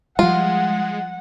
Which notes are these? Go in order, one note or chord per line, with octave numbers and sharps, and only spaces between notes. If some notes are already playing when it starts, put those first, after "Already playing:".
F3 G3 G#3 F4 F#5